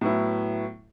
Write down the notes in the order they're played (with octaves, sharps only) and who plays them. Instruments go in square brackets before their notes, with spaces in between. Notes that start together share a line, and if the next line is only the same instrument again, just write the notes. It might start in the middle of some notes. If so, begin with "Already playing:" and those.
[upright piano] A2 F#3 B3 E4